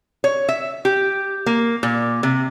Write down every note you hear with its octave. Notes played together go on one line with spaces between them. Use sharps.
C#5
E5
G4
A#3
A#2
C3